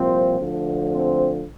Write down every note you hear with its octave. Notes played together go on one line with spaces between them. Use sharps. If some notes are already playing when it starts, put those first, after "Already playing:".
Already playing: C2 A#2 F3 C4 C5
D2 D3 F3
C4 C5